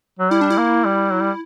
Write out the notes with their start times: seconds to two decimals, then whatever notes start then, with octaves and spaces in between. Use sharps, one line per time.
0.19 F#3
0.31 G3 E4
0.41 D4
0.50 E4
0.58 A#3
0.85 G3
1.11 F#3
1.21 G3